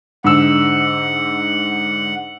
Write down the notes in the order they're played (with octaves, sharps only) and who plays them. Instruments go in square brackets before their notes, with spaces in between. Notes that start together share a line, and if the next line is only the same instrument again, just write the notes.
[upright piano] G#2 D3 E6 [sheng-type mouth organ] F#5